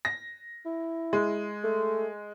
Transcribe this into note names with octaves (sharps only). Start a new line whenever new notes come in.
A#6
E4
G#3
A3